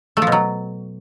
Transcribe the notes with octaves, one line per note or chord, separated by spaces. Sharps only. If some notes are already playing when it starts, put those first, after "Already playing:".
A3
F3
B2
F#3